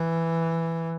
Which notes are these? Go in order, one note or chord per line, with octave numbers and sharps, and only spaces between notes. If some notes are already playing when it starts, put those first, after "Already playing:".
Already playing: E3